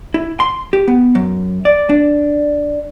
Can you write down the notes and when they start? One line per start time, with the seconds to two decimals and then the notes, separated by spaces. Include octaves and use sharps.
0.14 E4
0.40 C6
0.73 G4
0.88 B3
1.15 F#2
1.65 D5
1.89 D4